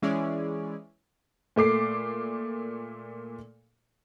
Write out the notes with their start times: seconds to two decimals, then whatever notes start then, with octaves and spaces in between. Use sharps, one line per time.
0.02 E3 G#3 C#4 E4 G#4 D5
1.56 A#2 A3 D6 C7